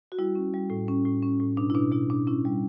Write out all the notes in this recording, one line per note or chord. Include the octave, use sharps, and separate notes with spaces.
F#4
G3 E4
C#4
G3
A2
C#4
A2
C#4
A2
B2 D4
E4
B2 D4
B2 E4
B2 D4
C#4 E4
G3